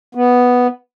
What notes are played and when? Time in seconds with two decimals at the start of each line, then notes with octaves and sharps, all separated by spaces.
0.15 B3